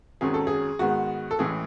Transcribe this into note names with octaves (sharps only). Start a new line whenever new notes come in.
G#1 F#2 D#3 F#3 C#4 G#4
A4
G#4
G#2 D#3 G#3 B3 F#4
A4
A1 A2 E3 G#3 G#4